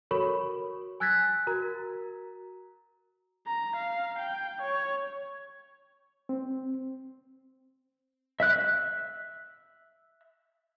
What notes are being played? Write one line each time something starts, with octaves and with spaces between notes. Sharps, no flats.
F#4 A4 A#4 C#5 B5 C#6
G#5 E6 F#6 G#6 A6 B6
F#4 A#4 A#5
A#5
F5
G5
C#5
C4
E5 F#6